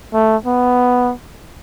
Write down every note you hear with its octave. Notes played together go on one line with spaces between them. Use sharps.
A3
B3